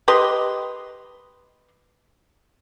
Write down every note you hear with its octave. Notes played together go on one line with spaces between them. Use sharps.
G4 B4 D#5 C6